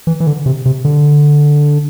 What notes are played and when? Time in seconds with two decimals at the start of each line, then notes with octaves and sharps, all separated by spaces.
0.07 E3
0.20 E3
0.27 D3
0.46 C3
0.66 C3
0.85 D3